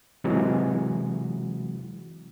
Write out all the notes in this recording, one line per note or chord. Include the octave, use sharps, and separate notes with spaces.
C3 E3 F#3 G#3 F#4